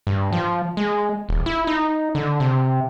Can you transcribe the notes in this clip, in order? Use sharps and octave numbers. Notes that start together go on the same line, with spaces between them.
G2
F3
G#3
E1
E4
D#4
D3
C3